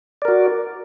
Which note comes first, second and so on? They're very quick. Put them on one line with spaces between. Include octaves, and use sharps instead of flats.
D5 A#4 F#4